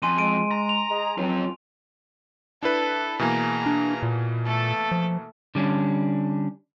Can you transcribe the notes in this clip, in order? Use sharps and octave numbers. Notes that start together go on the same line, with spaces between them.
F2 G#5 C6 D#7
G#3 D7 D#7
A#5
F7
G#3 G#4
C#2 F#3 C4 F4
D4 E4 A4 B4
B2 E3 A#3 G#4 A#5
D4
A#2
A3 A4
F3
D3 G3 C#4 D4